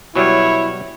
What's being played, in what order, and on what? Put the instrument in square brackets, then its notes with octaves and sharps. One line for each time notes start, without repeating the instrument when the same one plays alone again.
[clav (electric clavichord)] B2 F#3 G3 [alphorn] E4 [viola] C#5